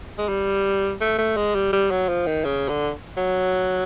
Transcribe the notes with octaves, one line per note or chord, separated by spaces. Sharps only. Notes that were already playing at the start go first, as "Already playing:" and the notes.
G#3
G3
A3
A3
G#3
G3
G3
F#3
F3
D#3
C#3
D3
F#3